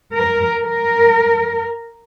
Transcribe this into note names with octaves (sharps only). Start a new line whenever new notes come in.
A#4
A#4